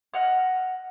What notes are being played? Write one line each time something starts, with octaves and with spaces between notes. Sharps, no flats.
D#5 F#5 F6